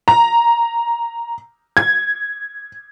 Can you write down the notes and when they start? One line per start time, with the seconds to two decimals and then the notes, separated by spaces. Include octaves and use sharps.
0.08 A#5
1.77 G#6